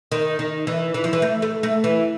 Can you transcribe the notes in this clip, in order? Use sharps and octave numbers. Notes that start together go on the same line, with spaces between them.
D#3
D#3
E3
E3
F3
E3
A3
A3
A3
E3